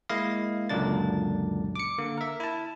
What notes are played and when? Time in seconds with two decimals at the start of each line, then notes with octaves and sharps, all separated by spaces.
0.09 G#3 A#3 E4 D#5 F5
0.69 C#2 F#2 A#2 D3 D4 A6
1.76 D6 C#7
1.98 D3 A#3
2.18 A#4 E5
2.40 E4 A5